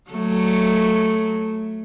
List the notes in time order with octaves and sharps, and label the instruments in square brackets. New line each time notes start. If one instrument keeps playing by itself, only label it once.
[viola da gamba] F#3 A3